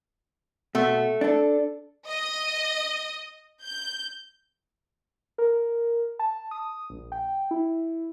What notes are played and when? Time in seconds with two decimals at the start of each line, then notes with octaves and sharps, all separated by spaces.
0.75 B2 A3
1.21 D4 A4
2.07 D#5
3.63 G6
5.38 A#4
6.19 A5
6.51 D#6
6.90 A#1
7.12 G5
7.51 E4